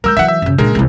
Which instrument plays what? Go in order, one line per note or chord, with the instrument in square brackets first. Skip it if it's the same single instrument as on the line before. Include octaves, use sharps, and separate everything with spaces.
[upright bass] F#3 G#3 [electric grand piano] A#4 E6 G6
[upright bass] E3 F#3 [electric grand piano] E5 F#5
[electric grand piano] E5
[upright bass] F#2 C#3
[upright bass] A#2 D3 [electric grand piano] G#3 A#4
[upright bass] C2 E3